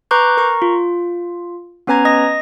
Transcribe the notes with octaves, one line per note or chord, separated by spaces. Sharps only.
B4 A#5 C#6 D6 F#6 G6
A#4 A#5 C#6
F4
B3 C#4 B4 G#5 A#5 G#6
D#5 D#6 A#6